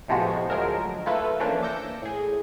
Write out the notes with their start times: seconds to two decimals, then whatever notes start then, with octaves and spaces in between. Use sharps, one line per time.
0.08 A2 C3 F3 G#3 B3 F#4
0.49 D2 F3 F#3 G#3 A#4 E7
1.06 A3 A#3 E4 F4 A4 B4
1.40 E3 F3 A3 A#3 C#4 D4
1.63 D6 E6 G6 A#6 C#7
2.02 A2 G#4